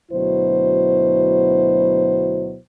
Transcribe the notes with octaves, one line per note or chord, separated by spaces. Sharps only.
D2 B2 F#3 E4 C5